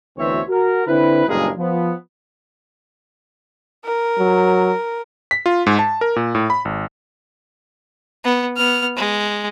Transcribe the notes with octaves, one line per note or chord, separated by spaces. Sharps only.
D2 B2 E3 C4 C#5 E5
F#4 A#4
D3 C4 E4 B4
F#1 G2 A#2 G#3 G#4 A#4
F3 B3
A#4
F#3
B6
F4
G#2
A5
A#4
A#2
A2
B5
G#1
B3
B3 F6
G#3